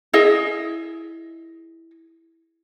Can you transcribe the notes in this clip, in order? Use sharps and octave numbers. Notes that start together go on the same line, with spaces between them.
E4 G#4 D#5 E5